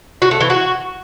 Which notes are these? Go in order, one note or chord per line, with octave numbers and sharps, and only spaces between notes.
F#4
A3
E3
F#4